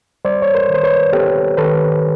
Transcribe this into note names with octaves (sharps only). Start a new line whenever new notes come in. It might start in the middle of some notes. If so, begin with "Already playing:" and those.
G3 C5 D5
C#5
A#4 C5
D#3
C5
B4 C#5
B3 G4 A4
D#3 A4 B4